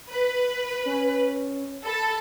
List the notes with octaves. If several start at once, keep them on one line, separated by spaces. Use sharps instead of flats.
B4
C#4
A4 B5